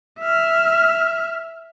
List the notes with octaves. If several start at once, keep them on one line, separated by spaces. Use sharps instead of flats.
E5 F6